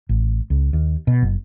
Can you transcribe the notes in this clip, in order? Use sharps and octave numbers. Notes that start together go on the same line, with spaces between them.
A1
C#2
D#2
B2
F#1